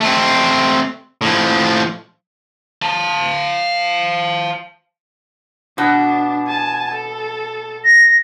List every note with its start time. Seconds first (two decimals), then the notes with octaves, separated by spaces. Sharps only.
0.01 A3 C4
1.21 A2 F3
2.82 F5 A5
5.78 B2 D4
6.47 G#5 A5
6.94 A4
7.84 A#6